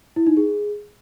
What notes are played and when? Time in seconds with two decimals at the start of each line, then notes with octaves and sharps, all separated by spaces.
0.16 E4
0.27 D#4
0.37 G#4